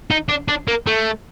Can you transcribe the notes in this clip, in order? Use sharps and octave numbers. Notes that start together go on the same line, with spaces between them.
D#4
D4
D4
A#3
A3